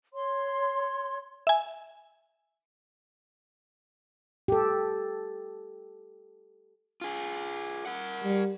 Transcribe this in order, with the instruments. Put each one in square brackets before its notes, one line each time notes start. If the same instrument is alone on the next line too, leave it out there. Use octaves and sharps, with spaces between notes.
[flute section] C#5 C6
[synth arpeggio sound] E5 G#5
[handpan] G4 A4
[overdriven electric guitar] F4 G#4
A#4 F#5
[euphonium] G3